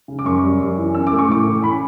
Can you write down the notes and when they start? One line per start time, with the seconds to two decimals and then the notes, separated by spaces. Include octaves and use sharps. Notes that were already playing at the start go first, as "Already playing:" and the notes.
0.08 C#3
0.19 D6
0.25 F#2 C#6
0.43 G3
0.61 F#2
0.77 E3
0.95 C#4 E6
1.07 D6
1.12 A3
1.19 C#6
1.28 A2 D6
1.46 E3
1.62 C#4 B5